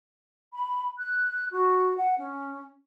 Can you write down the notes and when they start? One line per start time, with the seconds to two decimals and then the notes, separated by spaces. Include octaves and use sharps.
0.53 B5
0.97 F#6
1.52 F#4
1.97 F#5
2.19 C#4